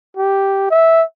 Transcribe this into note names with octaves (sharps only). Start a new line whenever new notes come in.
G4
E5